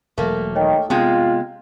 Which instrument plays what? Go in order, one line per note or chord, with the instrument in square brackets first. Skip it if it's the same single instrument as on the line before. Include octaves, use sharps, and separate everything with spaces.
[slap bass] E1 F#3 [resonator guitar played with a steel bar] A3 A#3 [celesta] A#4
[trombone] D#3 [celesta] C#5 D#5 G5
[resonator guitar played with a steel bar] C3 G#3 [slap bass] B3 [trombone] F4 [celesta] G5